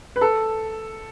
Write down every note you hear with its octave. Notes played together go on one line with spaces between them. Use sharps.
B4
A4